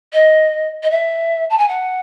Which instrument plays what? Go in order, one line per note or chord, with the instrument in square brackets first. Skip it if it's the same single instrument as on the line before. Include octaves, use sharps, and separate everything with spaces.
[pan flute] D#5
D#5
E5
A5
G#5
F#5